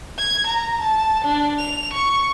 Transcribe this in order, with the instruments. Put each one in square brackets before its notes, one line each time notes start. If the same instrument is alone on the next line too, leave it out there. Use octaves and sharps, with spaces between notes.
[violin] G#6
A#5
A5
D4
F7
C#6